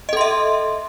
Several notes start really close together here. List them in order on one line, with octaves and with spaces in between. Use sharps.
D#5 A4 C6 E5